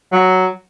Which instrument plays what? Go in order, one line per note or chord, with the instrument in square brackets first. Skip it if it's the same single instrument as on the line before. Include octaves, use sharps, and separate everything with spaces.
[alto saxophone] F#3